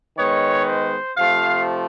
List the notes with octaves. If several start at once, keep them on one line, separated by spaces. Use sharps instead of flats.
D#3 G#3 B3 C#5
C5
C3 F3 A3 F5